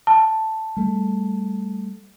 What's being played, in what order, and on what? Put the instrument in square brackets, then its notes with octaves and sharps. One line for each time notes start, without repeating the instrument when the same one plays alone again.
[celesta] A5
[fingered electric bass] G3 A3